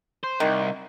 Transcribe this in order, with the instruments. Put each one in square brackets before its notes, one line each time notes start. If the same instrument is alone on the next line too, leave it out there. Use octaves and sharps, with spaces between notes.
[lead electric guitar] C5
[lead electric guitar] C2 [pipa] D#3